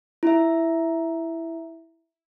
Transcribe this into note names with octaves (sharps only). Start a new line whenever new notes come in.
E4 E5